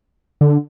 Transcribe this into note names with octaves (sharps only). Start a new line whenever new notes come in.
D3